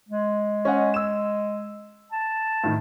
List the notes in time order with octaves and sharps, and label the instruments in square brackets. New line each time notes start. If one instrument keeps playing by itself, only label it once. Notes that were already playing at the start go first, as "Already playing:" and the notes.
[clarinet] G#3
[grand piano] C#4 D#5 F#5
E6 E7
[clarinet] A5
[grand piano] A2 D#3